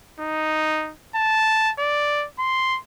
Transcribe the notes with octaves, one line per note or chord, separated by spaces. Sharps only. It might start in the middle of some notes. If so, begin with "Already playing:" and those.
D#4
A5
D5
C6